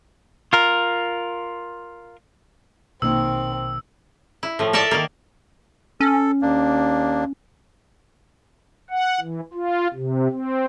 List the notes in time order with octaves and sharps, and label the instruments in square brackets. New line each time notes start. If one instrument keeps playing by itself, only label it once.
[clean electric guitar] F4 A#4
[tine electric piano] A#1 B2 [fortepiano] D#3 A#3 [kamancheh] C4 [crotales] E6
[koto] E4
A2 F3
A4 A#4 D5 E5 A5
D#3 A#3
[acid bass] C#4 [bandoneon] A4
[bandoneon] D#2 A#3 D4
[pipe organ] F#5
E3
F4
C3
C4